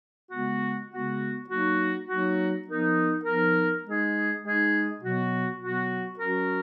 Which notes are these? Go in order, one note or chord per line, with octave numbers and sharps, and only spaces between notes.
C#3 G#3 B3 F#4
C#3 G#3 B3 F#4
F#3 A#3 D#4 F#4
F#3 A#3 D#4 F#4
F3 B3 D#4 A#4
F3 B3 D#4 A#4
G#3 D#4 G#4
G#3 D#4 G#4
B2 F#3 B3 F#4
B2 F#3 B3 F#4
F#3 C#4 F#4 A#4